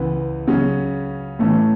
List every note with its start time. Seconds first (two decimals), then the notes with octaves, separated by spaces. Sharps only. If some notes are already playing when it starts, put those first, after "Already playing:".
Already playing: C#2 C#3 E3 B3
0.47 C#3 F#3 C#4
1.39 A2 E3 A3 C#4